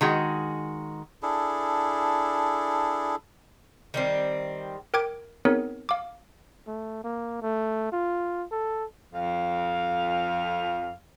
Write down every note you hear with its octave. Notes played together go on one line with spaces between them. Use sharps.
D#3 G#3 F#4
D4 E4 G#4 A4
D#3 G3 C4
A#4 G5 D6 G#6 D7
B3 C4 D#4 G#4 A#4 C#5
F5 D6
A3
A#3
A3
F4
A4
F2 F5